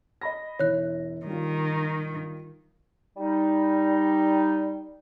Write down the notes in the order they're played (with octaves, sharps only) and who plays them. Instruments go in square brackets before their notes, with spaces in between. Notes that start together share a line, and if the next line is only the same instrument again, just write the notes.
[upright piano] D#5 B5 A#6
[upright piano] E1 E4 [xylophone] C#5 F#6
[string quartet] D#3 [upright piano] G3 F4
[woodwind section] G3 D#4